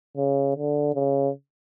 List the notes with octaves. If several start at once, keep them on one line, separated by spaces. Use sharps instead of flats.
C#3
D3
C#3